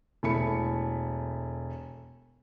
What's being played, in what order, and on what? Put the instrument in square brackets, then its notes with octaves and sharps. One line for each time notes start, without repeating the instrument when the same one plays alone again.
[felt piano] E1 A3 E4 B5 C#7